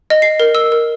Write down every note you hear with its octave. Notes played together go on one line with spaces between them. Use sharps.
D#5
C7
A#4
E6
A#4